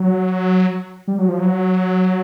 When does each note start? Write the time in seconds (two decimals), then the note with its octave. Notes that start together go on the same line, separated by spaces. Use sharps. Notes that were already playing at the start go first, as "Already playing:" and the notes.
Already playing: F#3
1.08 G3
1.18 F#3
1.29 F3
1.39 F#3